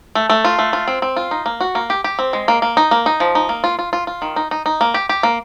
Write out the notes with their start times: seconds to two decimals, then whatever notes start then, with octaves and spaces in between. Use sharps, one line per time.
0.15 A3
0.30 A3
0.45 F4
0.59 A3
0.73 F4
0.88 C4
1.02 C4
1.16 F4
1.31 D#4
1.46 A#3
1.61 F#4
1.75 A#3
1.90 G4
2.04 G4
2.19 C4
2.33 G#3
2.48 A#3
2.62 A#3
2.77 D#4
2.91 A#3
3.06 D#4
3.20 F3
3.35 D#4
3.49 A#3
3.64 F4
3.79 F4
3.93 F4
4.07 F4
4.22 D#3
4.36 D#4
4.51 D#4
4.66 D#4
4.81 A#3
4.94 G4
5.09 G4
5.23 A#3